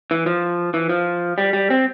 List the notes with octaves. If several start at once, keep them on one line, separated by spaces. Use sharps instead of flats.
E3
F3
E3
F3
G3
G3
C4